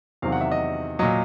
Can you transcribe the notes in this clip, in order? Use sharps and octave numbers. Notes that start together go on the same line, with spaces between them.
E2 C3 D#3 F#3 F5
F#5
E5
D#5
A#2 F#3 D#5